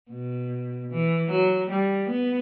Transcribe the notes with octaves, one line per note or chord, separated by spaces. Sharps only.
B2
E3
F#3
G3
B3